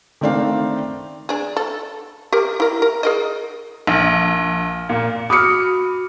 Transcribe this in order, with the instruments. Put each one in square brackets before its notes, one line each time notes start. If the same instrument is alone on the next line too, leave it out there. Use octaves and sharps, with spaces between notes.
[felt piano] D#3 A3 C4 D4 D5 F5
[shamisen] D4 G#4
A4
G4 A#4
E4 A#4
A#4
G#4 A#4 D#5
[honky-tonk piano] A#1
A#2
[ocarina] F#4 [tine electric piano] B5 D6 [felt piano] D#6 F6 C#7